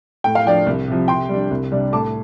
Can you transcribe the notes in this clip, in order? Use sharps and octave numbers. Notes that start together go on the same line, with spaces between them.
A2 G5
F5
F3 D4 D5 G5
C2
C3 F3
C3 G5 C6
G3 D4
C2
C3 G3 D4
A2 A5 D6